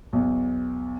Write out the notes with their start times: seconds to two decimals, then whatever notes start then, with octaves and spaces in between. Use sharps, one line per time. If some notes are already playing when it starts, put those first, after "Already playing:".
0.13 B1 E2